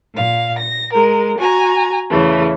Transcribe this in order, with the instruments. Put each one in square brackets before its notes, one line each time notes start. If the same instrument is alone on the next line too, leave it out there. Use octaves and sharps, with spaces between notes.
[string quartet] A#2 F5
A#6
G#3 A#4
F#4 G#5 A#5
E2 C#3 E3 A3